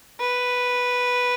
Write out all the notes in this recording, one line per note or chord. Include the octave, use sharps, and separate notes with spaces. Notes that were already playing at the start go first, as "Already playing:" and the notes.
B4